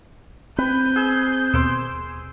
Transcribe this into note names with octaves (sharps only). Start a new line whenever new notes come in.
C4 B4 G6
G#4 E6
D#2 B2 C6 D6 E6